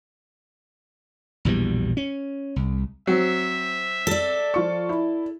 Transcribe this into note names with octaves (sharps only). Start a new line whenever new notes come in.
A#1 E2 B2 G3
C#4
C2
F#3 C4 E5
A4 D5
F3 F4 C#6
E4